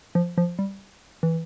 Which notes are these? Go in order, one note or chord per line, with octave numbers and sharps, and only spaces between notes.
F3
F3
G3
E3